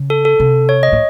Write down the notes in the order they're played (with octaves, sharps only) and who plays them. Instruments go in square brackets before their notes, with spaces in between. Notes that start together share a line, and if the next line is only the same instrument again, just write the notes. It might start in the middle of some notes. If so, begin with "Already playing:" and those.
Already playing: [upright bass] C#3
[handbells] A4
A4
[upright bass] C3
[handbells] C#5
D#5
[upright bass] A2